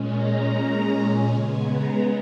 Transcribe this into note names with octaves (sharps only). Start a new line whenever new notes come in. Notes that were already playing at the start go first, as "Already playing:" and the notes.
Already playing: A#2 G#3 C#4
A#5
C#3 G#3 B3 G#5
A#5